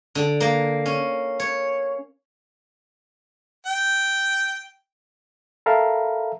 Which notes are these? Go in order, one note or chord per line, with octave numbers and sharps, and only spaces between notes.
D3
A#3
C#4
C#5
G5
A4 A#4 E5 F5 A#5 B5